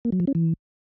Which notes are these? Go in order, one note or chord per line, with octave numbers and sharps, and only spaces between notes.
A#3
F#3
F3
C#4
E3